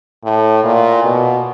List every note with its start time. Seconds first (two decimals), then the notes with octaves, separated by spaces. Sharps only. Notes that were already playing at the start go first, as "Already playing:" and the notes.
0.24 A2
0.64 A#2
1.04 B2